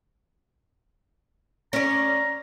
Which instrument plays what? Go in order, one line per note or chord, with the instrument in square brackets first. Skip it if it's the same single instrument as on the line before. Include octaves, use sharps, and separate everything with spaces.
[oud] C#4 D5 [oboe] A#5